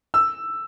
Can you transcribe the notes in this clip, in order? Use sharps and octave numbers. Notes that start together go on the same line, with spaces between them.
E6